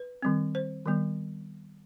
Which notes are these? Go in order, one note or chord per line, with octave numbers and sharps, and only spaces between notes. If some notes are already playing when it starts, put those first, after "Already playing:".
Already playing: B4
D#3 G3 C4
C5
D#3 G3 B3